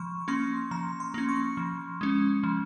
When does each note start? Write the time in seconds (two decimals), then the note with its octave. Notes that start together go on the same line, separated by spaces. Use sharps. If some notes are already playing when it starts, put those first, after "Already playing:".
Already playing: F3 C#6
0.28 A#3 C#4 C6
0.71 F3 A#5
1.00 C6
1.14 A#3 C#4
1.29 C#6
1.57 F3
2.01 G#3 C#4
2.43 F3